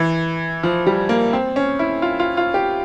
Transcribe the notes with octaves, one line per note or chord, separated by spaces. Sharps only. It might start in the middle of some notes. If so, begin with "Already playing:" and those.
Already playing: E3
F3
G3
A#3
C4
C#4
E4
F4
F4
F4
G4